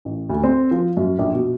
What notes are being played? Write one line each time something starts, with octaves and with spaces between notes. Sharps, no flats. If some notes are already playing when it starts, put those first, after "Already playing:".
A1
D2
C4
F3
F#2
A#1
B2